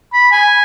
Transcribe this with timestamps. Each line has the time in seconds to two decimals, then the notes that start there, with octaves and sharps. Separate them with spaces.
0.13 B5
0.32 G#5